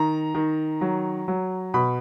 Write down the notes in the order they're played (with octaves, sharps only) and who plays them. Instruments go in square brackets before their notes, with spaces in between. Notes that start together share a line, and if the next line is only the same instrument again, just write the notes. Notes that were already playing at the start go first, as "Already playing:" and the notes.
Already playing: [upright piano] D#3 A#5
D#3
F#3
F#3
B2 B5